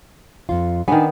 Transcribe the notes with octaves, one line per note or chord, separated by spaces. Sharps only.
F2 F4
D#3 B3 D4 G#5